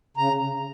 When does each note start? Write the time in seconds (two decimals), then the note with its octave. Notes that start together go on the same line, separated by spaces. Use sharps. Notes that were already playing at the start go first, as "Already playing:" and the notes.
0.17 C#3 A#5